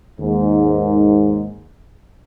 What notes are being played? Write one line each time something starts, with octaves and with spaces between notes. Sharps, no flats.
D#2 G#2